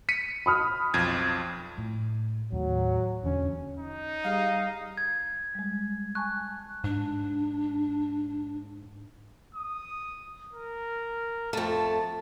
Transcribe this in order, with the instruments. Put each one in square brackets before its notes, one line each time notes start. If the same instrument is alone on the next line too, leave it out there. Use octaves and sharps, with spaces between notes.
[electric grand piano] B6 C#7 D#7
[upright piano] B5 D#6 F6
[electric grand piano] B1 F2 G#6
[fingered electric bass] A2
[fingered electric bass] D#2 A2 [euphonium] F#3
[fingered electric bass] E1 E2 D3 [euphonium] C#4
[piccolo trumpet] D#4
[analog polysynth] G3 G4 G#4 [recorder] F5
[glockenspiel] G#6
[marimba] G3 G#3
[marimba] G#5 A5 C#6 [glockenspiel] F#6
[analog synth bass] G#2 [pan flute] D4
[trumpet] D#6
A#4
[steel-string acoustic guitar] F2 A3 [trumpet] A5